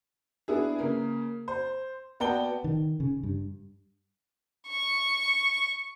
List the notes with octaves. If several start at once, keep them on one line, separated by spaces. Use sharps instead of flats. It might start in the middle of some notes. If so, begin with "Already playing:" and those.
B3 D4 E4 G#4
C#3 A#3
C5
B3 F#4 D5 G5 A5 G7
D#3
C#3
G2
C#6